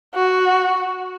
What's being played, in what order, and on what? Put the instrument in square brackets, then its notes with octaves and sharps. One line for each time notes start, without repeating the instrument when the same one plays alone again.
[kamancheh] F#4